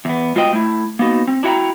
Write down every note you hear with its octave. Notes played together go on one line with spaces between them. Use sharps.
E2 B3
G#2 F4 F#4 C5 D#5 G5
A3 E4
A#3 B3 D#4 F#4
C4
D4 E4 F#4 F#5 G5 A#5